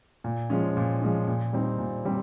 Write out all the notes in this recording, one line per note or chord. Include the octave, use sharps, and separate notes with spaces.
A#2
F3 G#3 C#4
A#2
F3 G#3 C#4
A#2
G3 C4 D#4
A#2
G3 C4